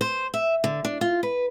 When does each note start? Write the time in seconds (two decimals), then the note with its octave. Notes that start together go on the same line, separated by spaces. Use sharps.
0.01 C5
0.34 E5
0.64 D3
0.85 D4
1.01 F4
1.23 B4